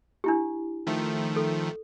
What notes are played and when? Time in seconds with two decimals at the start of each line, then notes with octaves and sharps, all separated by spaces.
0.24 D4 E4 G4
0.87 D#3 F3 A3
1.36 A4